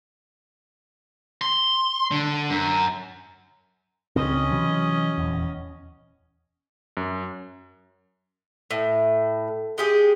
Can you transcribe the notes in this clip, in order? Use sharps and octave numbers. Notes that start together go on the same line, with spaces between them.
C6
D3
F#2
C#2 C#3 C4 C#4 D#5
C3 E3 F#3
D#1 E2
F#2
A2
G#3 G4 G#4